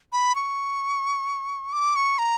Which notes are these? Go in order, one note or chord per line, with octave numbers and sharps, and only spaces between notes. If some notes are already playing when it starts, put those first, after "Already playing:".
B5
C#6
D6
C#6
A#5